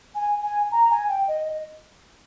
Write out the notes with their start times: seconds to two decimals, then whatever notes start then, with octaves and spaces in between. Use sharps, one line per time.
0.15 G#5
0.43 G#5
0.71 A#5
0.90 G#5
1.09 G5
1.28 D#5